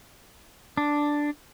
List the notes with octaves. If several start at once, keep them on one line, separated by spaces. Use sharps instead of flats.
D4